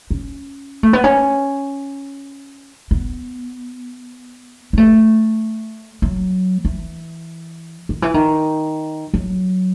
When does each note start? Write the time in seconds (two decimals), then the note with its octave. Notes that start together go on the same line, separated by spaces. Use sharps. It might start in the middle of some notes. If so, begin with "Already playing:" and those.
0.11 C#4
0.83 A3
0.93 B3
1.04 C#4
2.91 B3
4.73 B3
4.78 A3
6.02 F#3
6.65 E3
7.89 D#3
8.02 E3
8.14 D#3
9.14 F#3